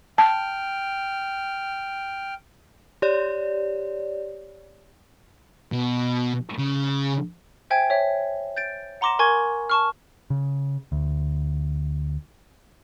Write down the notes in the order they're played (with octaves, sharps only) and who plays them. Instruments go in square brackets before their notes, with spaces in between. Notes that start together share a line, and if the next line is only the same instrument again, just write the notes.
[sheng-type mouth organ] G5 F6 [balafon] A5
[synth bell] G4 C#5 D5
[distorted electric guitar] B2
C#3
[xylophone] C5 E5 G5 G#5 G#6 D7
C#5 E5
G6 A6 D7
F#5 A#5 C6 D6 A#6 E7
A#4 G#5 C#6 G#6
A5 C#6 F6
[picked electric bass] C#3
D2